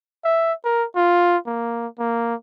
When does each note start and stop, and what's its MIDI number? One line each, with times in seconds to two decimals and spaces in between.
0.25 0.53 76
0.64 0.85 70
0.96 1.37 65
1.46 1.87 58
1.99 2.35 58